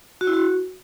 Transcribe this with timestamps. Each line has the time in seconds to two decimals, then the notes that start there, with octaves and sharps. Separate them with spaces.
0.21 F#4
0.27 E4
0.34 F#4